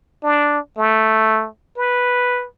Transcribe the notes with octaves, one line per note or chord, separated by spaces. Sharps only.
D4
A3
B4